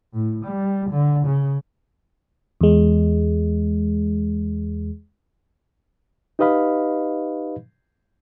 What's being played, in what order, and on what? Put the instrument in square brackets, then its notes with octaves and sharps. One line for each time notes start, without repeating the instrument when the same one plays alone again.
[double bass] A2
G3
D3
C#3
[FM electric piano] E2 G#3
[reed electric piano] D#4 G4 B4 D#5 F5 B5